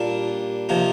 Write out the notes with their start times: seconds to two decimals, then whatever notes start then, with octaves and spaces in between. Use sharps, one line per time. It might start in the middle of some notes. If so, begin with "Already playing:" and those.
Already playing: A#2 G3 A#3 D4
0.69 C3 F3 A#3 D#4